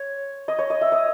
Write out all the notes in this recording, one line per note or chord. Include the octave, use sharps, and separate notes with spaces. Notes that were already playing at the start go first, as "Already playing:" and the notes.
Already playing: C#5
D#5
C#5
D#5
E5
D#5